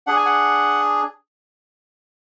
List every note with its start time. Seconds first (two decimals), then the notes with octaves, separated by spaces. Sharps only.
0.07 D4 G#4 F#5
0.16 G#5
0.26 F#5